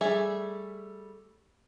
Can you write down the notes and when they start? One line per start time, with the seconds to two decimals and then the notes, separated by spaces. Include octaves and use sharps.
0.01 G3 A3 G#4 E5